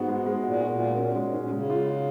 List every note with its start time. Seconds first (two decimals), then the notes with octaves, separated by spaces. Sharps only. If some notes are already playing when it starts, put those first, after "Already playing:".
Already playing: G#2 B3 F#4
0.08 G#3
0.26 G#3
0.44 A#2 F#4
0.62 F#4
0.71 A#2
0.80 F#4
0.97 A#2 C#4
1.16 A#2 G#3
1.25 G#2
1.33 C#4
1.38 A#2
1.51 C#3 G#3
1.70 F4
1.86 F4